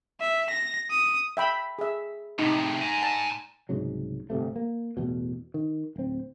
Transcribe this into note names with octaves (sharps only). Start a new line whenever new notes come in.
E5
A#6
D#6
E5 G5 B5
G#4 E5
A2 C3 D#4
G#5 A#5
A5
C2 G#2 C#3 F#3
G1 C2 C3 A3
A#3
A1 E2 B2
D#3
D1 C4